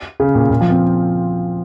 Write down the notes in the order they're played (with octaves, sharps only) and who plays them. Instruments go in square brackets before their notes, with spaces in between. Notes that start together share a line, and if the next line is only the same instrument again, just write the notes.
[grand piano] C#3
A#2
A#2
F3
C4